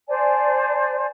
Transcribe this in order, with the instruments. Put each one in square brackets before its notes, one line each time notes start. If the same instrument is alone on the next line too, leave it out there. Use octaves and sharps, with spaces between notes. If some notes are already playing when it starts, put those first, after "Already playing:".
[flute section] C5 D5 G#5 A5